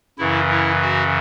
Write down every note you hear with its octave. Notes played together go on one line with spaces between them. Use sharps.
F#2 C#3 E3 E4
E4
F#4